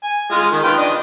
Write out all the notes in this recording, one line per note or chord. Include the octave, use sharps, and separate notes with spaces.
G#5
G#3 F4 D#5
D#3
F4 B4 G5
D4 D#5